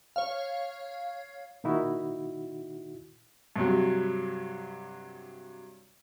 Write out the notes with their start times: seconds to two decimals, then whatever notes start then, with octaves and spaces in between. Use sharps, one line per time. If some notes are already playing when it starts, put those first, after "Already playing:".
0.16 C#5 F5
1.64 A#2 D#3 D#4 E4 F#4
3.56 G2 C3 F#3